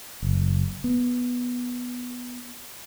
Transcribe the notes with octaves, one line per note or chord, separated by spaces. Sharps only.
F#1
B3